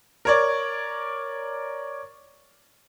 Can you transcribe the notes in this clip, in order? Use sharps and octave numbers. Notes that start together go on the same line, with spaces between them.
A#4 C#5 D5